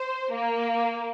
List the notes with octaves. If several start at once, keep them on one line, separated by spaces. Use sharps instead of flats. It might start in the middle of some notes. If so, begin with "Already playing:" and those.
Already playing: C5
A#3